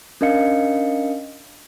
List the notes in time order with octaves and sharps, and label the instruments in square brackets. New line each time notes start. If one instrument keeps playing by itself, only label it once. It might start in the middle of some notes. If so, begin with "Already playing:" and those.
[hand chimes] C#4 D4 A#4 D#5 F5 C#7